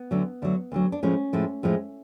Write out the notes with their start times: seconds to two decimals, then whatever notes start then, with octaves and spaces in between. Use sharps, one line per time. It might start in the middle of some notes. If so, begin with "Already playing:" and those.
Already playing: B3
0.11 D2 D3 F#3
0.42 D2 D3 F#3
0.72 D2 D3 F#3
0.92 D4
1.03 A2 F3 G#3 C#4
1.33 A2 F3 G#3
1.63 A2 F3 G#3